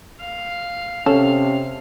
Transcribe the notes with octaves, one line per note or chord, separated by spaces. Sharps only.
F5
C3 C#4 A4 F5